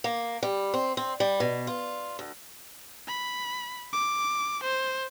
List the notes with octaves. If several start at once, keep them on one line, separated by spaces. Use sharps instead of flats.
A#3
G3
C4
C4
G3
B2
F4
D2
B5
D6
C5